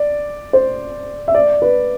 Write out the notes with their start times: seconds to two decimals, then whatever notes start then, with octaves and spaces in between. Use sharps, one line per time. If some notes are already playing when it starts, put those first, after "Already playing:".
Already playing: D5
0.53 C5
1.28 E5
1.35 D5
1.62 B4